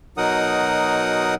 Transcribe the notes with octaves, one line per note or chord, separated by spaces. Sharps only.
B2 F#3 D#4 A#4 F#5 D#6